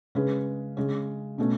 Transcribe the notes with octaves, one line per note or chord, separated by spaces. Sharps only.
C#3 G#3 C#4 G#4 B4
C#3 G#3 C#4
B2 A3 C#4